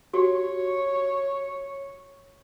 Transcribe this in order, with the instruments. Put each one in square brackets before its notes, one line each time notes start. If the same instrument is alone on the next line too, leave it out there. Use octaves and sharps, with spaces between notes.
[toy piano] F#4 G4 [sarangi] C#5